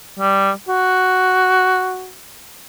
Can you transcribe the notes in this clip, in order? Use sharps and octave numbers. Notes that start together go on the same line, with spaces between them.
G3
F#4